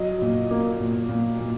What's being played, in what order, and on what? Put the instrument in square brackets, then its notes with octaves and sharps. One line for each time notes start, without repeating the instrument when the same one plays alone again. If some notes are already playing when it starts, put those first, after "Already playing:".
Already playing: [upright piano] F#3 D#5
A#2
A#3
A#2
A#2
A#2